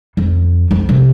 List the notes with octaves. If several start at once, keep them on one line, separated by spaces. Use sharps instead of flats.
F2
F2
C3